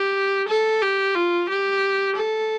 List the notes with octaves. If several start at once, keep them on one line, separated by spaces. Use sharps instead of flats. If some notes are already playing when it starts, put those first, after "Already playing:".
Already playing: G4
A4
G4
F4
G4
A4